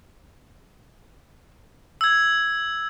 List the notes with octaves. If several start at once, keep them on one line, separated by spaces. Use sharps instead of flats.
E6 G#6